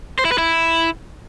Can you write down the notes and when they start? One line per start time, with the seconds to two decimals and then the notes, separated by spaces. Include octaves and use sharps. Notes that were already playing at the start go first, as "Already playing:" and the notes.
0.19 C5
0.25 E4
0.32 B4
0.38 E4